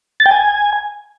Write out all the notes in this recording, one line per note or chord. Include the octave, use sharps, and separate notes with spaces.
A6
G5
G#5